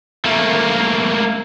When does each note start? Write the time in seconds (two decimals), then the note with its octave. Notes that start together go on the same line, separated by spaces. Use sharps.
0.25 A3 A#3